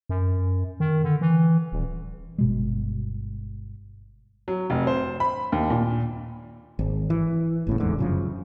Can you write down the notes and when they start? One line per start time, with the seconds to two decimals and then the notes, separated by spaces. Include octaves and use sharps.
0.09 F#2
0.80 D#3
1.04 D3
1.21 E3
1.72 D#1
2.38 G1 B2 G#3
4.48 F#3
4.70 F1
4.87 C5
5.20 B5
5.52 D#2
5.70 A#2
6.79 G#1
7.10 E3
7.67 G1 A2 C#3
7.80 D1 E2 G#2 D3
7.99 F#2 C#3 F3